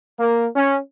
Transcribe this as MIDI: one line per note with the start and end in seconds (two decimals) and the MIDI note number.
0.19 0.47 58
0.55 0.77 61